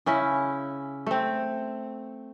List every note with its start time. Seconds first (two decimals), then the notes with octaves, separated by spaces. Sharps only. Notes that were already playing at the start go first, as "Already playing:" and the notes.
0.06 C#3 C#4 E4
1.06 A3 C4